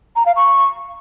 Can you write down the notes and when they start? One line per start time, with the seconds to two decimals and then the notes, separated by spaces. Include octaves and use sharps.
0.16 A#5
0.26 F5
0.36 C#6